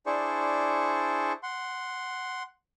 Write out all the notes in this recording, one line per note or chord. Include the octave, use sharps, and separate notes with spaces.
D4 E4 G#4 C5 D5 C#6
F#5 C6